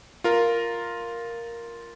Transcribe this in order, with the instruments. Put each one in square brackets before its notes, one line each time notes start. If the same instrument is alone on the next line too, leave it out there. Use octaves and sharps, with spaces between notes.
[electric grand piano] F4 A#4